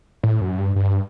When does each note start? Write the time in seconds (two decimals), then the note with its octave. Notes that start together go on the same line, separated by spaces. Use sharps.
0.24 A2
0.41 F#2
0.58 G2
0.76 G2